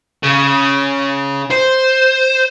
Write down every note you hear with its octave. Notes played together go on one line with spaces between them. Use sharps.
C#3
C5